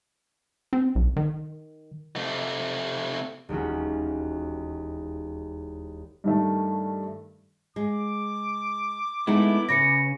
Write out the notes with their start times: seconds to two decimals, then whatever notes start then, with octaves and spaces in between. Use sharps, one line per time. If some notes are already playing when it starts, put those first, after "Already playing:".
0.73 C4
0.95 B1
1.16 D#3
2.16 C3 A3
3.49 E1 D#2 C#4 F#4
6.24 G2 D#3 A3
7.76 G#3 D6
9.27 G#3 A3 B3 D#4 E4
9.69 C#3 B4 C#5 A#6 C#7